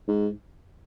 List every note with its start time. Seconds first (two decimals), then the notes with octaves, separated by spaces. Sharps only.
0.08 G#2